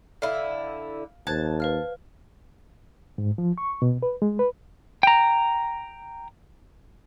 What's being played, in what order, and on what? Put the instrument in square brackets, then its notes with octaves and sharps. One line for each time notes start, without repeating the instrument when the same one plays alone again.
[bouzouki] D3 E4 [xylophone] F5 F6
[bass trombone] D#2 [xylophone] C5 F#6 G#6 [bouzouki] A5
[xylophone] B4 F5 F6
[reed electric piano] G#2
F3
C#6
B2
B4
G#3
B4
[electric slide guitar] G5 A#5